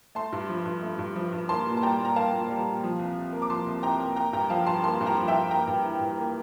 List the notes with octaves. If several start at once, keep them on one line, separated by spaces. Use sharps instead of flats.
A3 A5 C6
G2
F3
G2
A3
G2
F3
G2
A#3 A5 C6
A#2
A5
G3 G5 A#5
A#2
A#5
A#3 F5 A5
A#2
G3
A#2
F3
C2
C3
A#3
D6
F3 A5 C6
C2
C3 G5 A#5
A#3
A#3 G5 A#5
G2 G5 A#5
F3 F5 A5
G2 A5 C6
A#3 A5 C6
G2 A5
G5 A#5
F3
E5 G5
G2
A#3 G5 A#5
G2
E3
G2
A#3